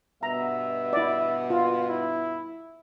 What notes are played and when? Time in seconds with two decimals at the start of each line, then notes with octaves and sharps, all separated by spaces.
0.23 G2 B2 B3 E5 A#5
0.93 E4 D5
1.50 F4
1.90 E4